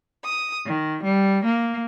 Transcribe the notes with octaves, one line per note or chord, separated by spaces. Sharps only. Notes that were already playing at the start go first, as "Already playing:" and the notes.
D#6
D#3
G3
A#3